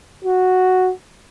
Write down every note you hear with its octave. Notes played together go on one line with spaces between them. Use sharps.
F#4